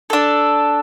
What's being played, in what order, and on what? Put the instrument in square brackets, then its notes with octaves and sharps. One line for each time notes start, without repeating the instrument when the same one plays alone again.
[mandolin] D4 A4